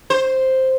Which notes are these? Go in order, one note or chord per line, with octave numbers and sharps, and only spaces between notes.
C5